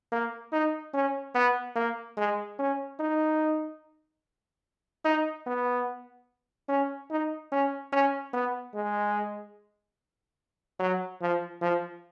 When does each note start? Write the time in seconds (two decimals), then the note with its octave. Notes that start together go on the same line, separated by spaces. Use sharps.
0.12 A#3
0.52 D#4
0.94 C#4
1.35 B3
1.76 A#3
2.17 G#3
2.59 C#4
3.00 D#4
5.05 D#4
5.47 B3
6.69 C#4
7.11 D#4
7.52 C#4
7.92 C#4
8.33 B3
8.74 G#3
10.79 F#3
11.22 F3
11.62 F3